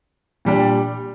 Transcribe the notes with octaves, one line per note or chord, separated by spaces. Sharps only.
A#2 G3 D4 G4